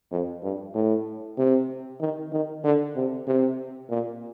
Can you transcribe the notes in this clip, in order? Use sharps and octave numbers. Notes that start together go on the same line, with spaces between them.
F2
G2
A2
C3
D#3
D#3
D3
C3
C3
A#2